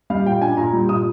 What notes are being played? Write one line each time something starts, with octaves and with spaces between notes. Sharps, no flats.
G3 F5
A#2 G5
D4 G#5
A#2 A#5
G3
A#2 D#6